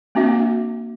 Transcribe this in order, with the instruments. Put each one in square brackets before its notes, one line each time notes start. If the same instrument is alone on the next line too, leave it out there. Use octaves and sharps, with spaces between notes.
[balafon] A#3 C4 D4 F#4 E5